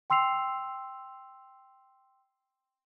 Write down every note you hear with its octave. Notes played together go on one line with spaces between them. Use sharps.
G5 C6 E6 C7 F7